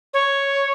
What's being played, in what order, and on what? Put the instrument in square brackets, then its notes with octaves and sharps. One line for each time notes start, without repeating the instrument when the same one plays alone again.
[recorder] C#5